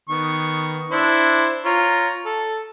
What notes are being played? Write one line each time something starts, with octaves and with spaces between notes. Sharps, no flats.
D#3 B3 C#6
D4 E4 C5
F4 C#5 A#5
A4